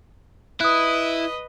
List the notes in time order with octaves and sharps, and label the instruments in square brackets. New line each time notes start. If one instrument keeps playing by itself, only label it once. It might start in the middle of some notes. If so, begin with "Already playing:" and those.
[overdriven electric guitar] E4 [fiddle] B4 D#5 [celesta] D#6 F#6